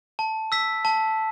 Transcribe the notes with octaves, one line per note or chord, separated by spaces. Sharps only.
A5
E6 B6
A5